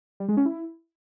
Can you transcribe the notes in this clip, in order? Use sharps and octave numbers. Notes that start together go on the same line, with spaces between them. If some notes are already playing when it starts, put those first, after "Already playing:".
G3
G#3
C#4
E4